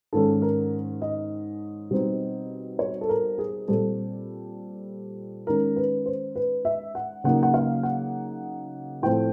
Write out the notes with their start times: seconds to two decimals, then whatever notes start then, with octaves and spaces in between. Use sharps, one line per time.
0.13 G#2 D#3 G#3 C#4 A4
0.42 A#4
1.02 D#5
1.91 B2 G3 C4 D#4
2.79 C#5
3.01 A4
3.09 A#4
3.38 G#4
3.68 A#2 G3 C4 A4
5.47 D#3 G#3 C#4 A#4
5.76 B4
6.06 C5
6.35 B4
6.65 E5
6.95 F#5
7.24 C#3 F#3 A#3 D#4 F#5
7.43 F#5
7.54 F5
7.83 F#5
9.02 A2 F3 A3 C4 G5